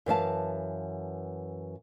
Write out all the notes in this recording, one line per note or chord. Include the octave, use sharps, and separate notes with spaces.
F#2 E3 F5 A5